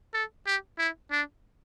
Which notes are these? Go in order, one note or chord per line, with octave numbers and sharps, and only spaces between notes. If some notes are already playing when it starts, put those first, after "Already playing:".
A4
G4
E4
D4